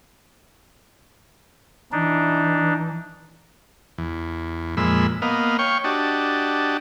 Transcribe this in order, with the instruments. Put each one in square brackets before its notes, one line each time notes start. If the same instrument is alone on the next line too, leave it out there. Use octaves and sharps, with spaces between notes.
[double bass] E3 [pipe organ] D4 D#4
[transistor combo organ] E2
F2 A#2 G#3 B5 E6
A#3 B3 D#5 F5
C#5 F5 G5 C#6
D4 F#4 G4 D#5 A5